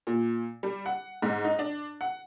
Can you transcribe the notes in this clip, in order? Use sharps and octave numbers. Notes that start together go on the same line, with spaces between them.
A#2
G3
F#5
G#2
D#4
D4
F#5